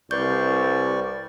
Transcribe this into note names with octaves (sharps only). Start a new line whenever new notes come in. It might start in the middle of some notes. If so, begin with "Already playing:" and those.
C2 B4 D5 C#6 G6